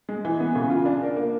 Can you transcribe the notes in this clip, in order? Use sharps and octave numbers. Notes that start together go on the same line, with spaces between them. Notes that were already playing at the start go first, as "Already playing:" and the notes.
G#3
E3
B3
C#3
F4
D4
A#4
A#3